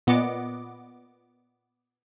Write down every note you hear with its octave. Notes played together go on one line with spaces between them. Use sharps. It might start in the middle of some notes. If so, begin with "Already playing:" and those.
A#2 B3 D#5 F#5 D6